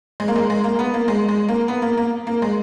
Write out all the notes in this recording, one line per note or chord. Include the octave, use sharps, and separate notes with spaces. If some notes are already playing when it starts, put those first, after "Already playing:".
G#3
A#3
G#3
G#3
A#3
B3
A#3
G#3
G#3
A#3
B3
A#3
A#3
A#3
G#3